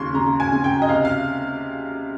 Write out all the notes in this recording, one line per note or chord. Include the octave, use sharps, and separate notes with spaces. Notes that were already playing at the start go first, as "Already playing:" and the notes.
Already playing: D#2 C#3 C6 C#6
C#3 A#5
G#5
C#3
G5
D#5
C3 F5
F5